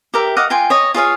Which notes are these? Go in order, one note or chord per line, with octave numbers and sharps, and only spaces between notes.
G4 A#4 E5
D#5 F5 F#5 D6
F4 G5 G#5 C6
C#5 D#5
F4 G#4 C#5 F5